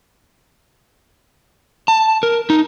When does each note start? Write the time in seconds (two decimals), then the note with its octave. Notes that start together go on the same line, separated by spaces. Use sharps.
1.88 A5
2.23 A#4
2.50 D#4